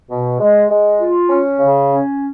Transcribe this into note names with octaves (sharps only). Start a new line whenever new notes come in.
B2
G#3
G#3
F4
C#4
C#3
C#4